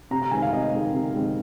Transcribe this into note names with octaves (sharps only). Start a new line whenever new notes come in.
C3 A#5
A#5
D#3 G#3 C4 G#5
F5
C3 D#5
D#3 G#3 C4
C3
D#3 G#3 C4